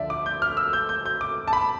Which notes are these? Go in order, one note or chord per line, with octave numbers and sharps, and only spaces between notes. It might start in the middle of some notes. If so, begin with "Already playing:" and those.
Already playing: D2 D3 F3 D5 E5
D6
G6
F6
E6
G6
G6
G6
D6
A5
B5